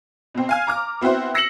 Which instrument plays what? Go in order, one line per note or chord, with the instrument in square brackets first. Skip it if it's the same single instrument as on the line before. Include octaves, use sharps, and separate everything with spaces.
[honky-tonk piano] B2 C4
F5 G#5 F6
A#5 D6 F6
B3 C4 E4 F#4 C5
E6 A#6 C7 C#7 E7 F#7